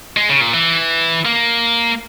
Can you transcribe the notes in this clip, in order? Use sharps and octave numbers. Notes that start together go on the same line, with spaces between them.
G#3
C#3
A#2
E3
A#3